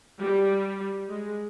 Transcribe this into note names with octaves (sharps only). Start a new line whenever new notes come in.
G3
G#3